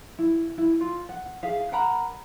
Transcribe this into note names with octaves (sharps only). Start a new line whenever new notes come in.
E4
E4
F4
F#5
G#4 E5 F5
A#4 F#5 A#5 B5